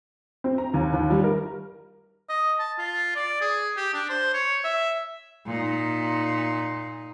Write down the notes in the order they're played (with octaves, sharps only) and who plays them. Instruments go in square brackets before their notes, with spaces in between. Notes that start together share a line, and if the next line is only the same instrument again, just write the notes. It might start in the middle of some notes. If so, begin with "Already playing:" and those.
[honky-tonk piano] C4
A#5
D#2
D#2
G3
A#4
[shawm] D#5
A5
F4
D5
G#4
G4
D4
C5
C#5
E5
[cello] A#2 D#4